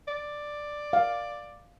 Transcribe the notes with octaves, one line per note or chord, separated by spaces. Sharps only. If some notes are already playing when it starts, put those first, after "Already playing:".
D5
F5